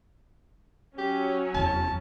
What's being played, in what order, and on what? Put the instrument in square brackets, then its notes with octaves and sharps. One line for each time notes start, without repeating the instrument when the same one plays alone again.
[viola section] F#3 C#4 [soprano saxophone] G4
[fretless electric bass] F1 E2 [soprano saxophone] A5